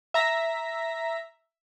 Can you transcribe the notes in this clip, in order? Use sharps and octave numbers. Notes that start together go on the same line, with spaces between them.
E5 A#5 A#6 B6